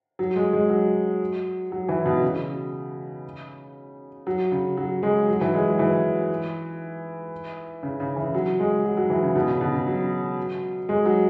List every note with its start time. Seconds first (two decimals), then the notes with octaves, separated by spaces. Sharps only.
0.19 F#3
0.36 G#3
0.53 G#3
0.70 F#3
1.72 F#3
1.89 E3
2.06 B2
2.23 C#3
4.27 F#3
4.52 C#3
4.77 F#3
5.03 G#3
5.28 F#3
5.41 E3
5.54 G#3
5.67 F#3
5.79 E3
7.83 C#3
8.00 C#3
8.16 E3
8.34 F#3
8.60 G#3
8.84 F#3
8.97 F#3
9.10 E3
9.23 C#3
9.35 B2
9.48 C#3
9.61 B2
9.74 C#3
9.87 F#3
10.89 G#3
11.06 F#3